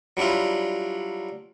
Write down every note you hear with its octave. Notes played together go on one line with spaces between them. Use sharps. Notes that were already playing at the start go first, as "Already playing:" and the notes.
F#3 G3 D4 E4 F4